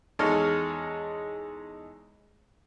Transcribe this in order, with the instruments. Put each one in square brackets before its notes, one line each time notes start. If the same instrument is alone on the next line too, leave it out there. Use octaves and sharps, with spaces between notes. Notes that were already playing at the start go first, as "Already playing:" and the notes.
[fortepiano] E2 G#3 D#4 A4 C#5 F6